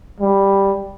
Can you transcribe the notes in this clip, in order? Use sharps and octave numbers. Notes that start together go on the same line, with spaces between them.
G3